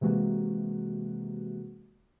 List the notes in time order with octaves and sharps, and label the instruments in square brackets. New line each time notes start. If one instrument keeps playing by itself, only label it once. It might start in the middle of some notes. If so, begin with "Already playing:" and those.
[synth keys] C3 E3 G#3 A#3 F#4